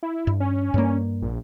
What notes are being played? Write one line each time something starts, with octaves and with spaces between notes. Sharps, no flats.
E4
G2
C#4
G2 A#3
A#1